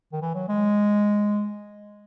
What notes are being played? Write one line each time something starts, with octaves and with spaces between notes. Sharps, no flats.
D#3
E3
F#3
G#3